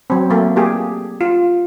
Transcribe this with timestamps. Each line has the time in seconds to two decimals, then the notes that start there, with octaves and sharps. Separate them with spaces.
0.10 F#3 C4
0.30 F#3 A3 A#3
0.56 A#3 G4 G#4
1.21 F4